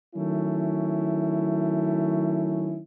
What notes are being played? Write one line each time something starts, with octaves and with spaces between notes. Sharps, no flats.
D#3 F#3 A3 C#4 E4